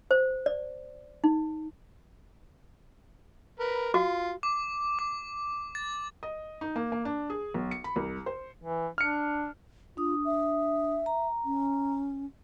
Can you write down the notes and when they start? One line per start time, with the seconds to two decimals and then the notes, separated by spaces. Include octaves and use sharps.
0.11 C5
0.46 D5
1.24 D#4
3.60 A#4 B4
3.94 F4 F#4
4.43 D6
4.99 D6
5.75 A6
6.23 D#5
6.61 D#4
6.76 A#3
6.92 A#3
7.05 D4
7.30 G#4
7.54 B1
7.71 C#7
7.84 B5
7.96 C2
8.26 C5
8.62 E3
8.98 D4 F6 C#7
9.97 D4 F4 D#6
10.25 E5
11.06 A#5
11.45 C#4